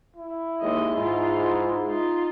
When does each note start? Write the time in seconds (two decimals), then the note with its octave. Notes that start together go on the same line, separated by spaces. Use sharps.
0.16 E4
0.61 D#2 G#3 D#5
0.97 G#2 F4
1.88 D#4 F4